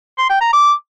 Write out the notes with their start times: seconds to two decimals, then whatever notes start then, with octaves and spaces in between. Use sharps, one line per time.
0.18 C6
0.29 G5
0.41 A#5
0.53 D6